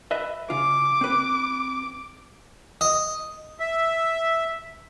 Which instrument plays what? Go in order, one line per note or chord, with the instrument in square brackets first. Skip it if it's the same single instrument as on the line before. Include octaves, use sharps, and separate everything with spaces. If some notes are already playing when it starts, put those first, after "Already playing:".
[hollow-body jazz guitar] B4 D#5 E5
[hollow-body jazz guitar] C#3 F4 [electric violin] D6
[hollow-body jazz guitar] C4 B4
[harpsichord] D#5
[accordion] E5